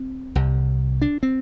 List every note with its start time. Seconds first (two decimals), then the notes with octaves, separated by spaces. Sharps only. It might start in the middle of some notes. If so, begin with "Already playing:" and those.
Already playing: C4
0.35 C2 C3
1.02 D4
1.23 C4